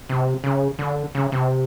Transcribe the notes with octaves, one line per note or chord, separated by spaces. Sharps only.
C3
C#3
D3
C#3
C3